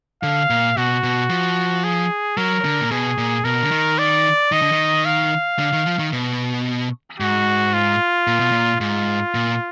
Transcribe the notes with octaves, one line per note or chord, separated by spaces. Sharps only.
D3 F5
A#2
B2 F#4
B2
F3
G#4
F#3 A#4
D3
A#2
B2 G#4
A#2
B2 A#4
D3
D#3
D5
D#3 D#5
D3
D#3
F5
D3
D#3
F3
D#3
B2
G#2 F#4
F4
A#2
B2
A#2
G#2 F4
A#2